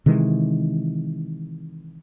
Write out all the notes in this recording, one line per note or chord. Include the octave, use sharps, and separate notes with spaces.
C3 D#3 E3 G#3